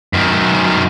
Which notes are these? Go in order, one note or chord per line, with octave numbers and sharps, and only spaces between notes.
F#2 D#3